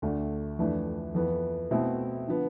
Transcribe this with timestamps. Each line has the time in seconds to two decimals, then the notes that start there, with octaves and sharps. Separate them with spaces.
0.02 D2 D3 A3 D4
0.59 F2 E3 A3 D4
1.14 F2 E3 B3
1.71 B2 A3 C4 E4
2.28 D3 F3 B3